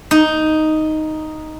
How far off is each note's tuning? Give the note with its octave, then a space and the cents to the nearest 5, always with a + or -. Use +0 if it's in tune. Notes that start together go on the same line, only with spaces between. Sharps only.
D#4 +0